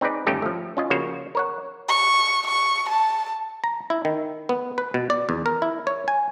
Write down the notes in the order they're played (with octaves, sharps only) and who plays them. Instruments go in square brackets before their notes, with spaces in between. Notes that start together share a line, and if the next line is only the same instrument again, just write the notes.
[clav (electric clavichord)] C4 D#4 G#4 B4 D5
G1 D#2 A3 C#4 D#4 G4
F3 A3
C#4 F4 D#5
C#3 F3 A#3 F#4 C5 C#5
A#4 C#5 F#5
[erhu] C#6
C#6
A5
[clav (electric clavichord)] A#5
E4
D#3
B3
B4
B2
D5
E2
A#4
E4
C#5
G#5